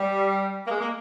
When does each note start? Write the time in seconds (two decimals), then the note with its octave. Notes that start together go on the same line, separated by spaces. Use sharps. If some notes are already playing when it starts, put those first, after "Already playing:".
Already playing: G3
0.66 A#3
0.70 G#3
0.80 A#3